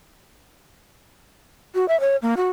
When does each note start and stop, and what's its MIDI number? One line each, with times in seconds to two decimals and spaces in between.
1.75 1.86 66
1.88 1.98 76
2.00 2.16 73
2.22 2.34 58
2.37 2.51 66